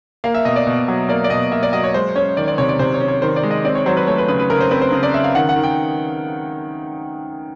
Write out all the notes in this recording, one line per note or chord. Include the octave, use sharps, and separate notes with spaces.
A#3 F5
E5
B2 D#5
D5
B2
F#3
A#3 D5
D5
B2 D#5
A#3 E5
D5
F#3 D#5
C#5
G#3 C5
C#4 C#5
D#3 D5
D5
C3 C#5
D5
C3 C5
C#5
C#4
C#5
D#3 C5
D5
G#3
D#5
C4 D5
C#5
F#3 C5
B4
A3 C#5
B4
C#3 B4
B4
C#3 A#4
C5
C4 B4
C5
C#3
D5
C#3 E5
F5
D#3 F#5
F#5
D#3
G5